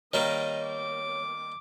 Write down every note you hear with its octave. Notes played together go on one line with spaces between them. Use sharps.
D#3 G3 A#3 C#5 D#5
D6